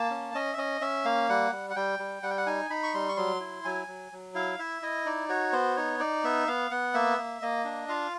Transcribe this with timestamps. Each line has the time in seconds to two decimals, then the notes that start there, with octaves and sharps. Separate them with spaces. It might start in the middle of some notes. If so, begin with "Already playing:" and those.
Already playing: A#3 A5
0.10 C#4
0.34 C#4 D#5
0.53 E5
0.57 C#4 D#5
0.81 C#4 E5
1.05 A#3 F5
1.29 G3 F#5
1.52 G3
1.70 F#5
1.76 G3 G5
1.99 G3
2.23 G3 F#5
2.30 G5
2.38 F#5
2.46 D#4 G#5
2.70 D#4 B5
2.83 C#6
2.94 G3 C6
3.09 C#6
3.17 F#3 C6
3.40 E4
3.65 F#3 G#5
3.87 F#3
4.12 F#3
4.35 E4 F5
4.59 E4 E5
4.82 E4 D#5
5.05 D#4 D5
5.29 F#4 C#5
5.52 B3 C5
5.76 D#4 C#5
6.00 D#4 D5
6.24 B3 E5
6.47 B3 F5
6.71 B3 F#5
6.94 A#3 E5
7.18 A#3
7.42 A#3 D#5
7.65 D4
7.89 F4 F5